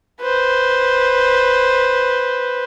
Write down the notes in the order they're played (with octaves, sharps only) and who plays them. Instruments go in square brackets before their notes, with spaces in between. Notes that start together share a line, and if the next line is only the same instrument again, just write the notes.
[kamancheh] B4 C5